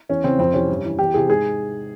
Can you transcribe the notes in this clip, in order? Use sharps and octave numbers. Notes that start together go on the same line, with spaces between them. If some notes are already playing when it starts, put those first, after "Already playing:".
E2 C#4
C#3 E3 C4
F2 C4
C3 E3 C#4
G2
E3
E2 G4
C3 E3 G#4
G#2 G#4